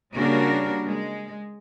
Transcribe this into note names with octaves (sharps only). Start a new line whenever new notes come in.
C#3 G3 A#3 D4 F#4 A#4
G#3